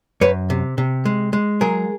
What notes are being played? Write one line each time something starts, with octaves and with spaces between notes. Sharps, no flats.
F#2 B4 C#5
C3
C3
G#3
G#3
F#3 G#4 A#4